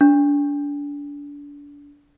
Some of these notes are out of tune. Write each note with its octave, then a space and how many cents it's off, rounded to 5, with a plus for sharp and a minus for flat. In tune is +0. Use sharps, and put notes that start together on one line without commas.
D4 -30